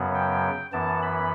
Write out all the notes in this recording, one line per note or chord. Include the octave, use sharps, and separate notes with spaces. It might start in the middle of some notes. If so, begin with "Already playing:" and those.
Already playing: F#2 C#3 F#3 B3
G5
F#2 E3 B3 A5
B5